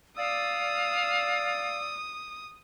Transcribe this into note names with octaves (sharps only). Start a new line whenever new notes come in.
D5 F5 D#6 E6